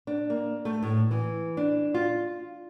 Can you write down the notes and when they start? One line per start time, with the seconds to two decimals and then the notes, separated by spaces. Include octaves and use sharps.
0.07 D4
0.30 A#3
0.65 A3
0.83 A2
1.11 E3
1.57 D4
1.94 F4